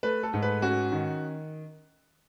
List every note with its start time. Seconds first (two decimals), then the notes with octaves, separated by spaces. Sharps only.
0.03 A3 B4
0.23 A4
0.33 G#2
0.42 B4
0.62 C#4 F#4
0.92 D#3